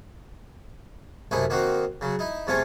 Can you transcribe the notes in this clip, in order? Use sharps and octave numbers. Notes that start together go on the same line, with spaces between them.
F#2 C3 A3 C#4 D#4 E4
D#3 A#3 C4 D#4 F#4
C#3 F#3
D#4 E4
E2 C3 A3 F4 C#5 G#5